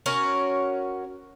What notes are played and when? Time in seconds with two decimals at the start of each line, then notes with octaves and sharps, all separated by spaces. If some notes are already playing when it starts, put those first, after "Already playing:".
0.06 C#4 F#4 A#4 C#5